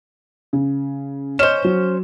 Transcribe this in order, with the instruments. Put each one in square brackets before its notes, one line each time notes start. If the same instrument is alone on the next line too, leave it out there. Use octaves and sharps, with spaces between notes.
[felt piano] C#3
[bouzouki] C#4 C5 [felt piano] D#5 E7
[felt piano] F#3